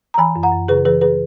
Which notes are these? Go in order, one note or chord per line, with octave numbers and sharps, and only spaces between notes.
A#5
E3 G#5 B5
F#2
F#5 A#5
F#2
C#3 G#4 B4
E3 G#4 B4
G#4 B4